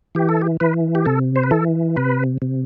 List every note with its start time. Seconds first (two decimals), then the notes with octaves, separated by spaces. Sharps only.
0.15 E3 G4
0.29 A4
0.41 G4
0.60 E3 B4
0.95 G4
1.06 C3 A4
1.36 C5
1.43 B4
1.51 E3 A4
1.96 C3 B4
2.42 C3